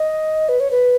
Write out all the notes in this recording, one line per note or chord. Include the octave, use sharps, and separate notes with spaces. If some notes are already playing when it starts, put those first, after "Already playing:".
Already playing: D#5
B4
C#5
B4